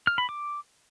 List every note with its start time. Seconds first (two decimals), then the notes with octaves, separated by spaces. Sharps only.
0.07 F6
0.18 B5
0.29 D6